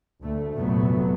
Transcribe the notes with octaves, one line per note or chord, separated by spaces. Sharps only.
D2 A3
F1 A#2 F#3 A3 B3